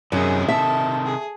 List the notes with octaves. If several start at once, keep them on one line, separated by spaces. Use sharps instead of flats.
F#2 C3 D#3 E4 G#4
A4 E5
G#4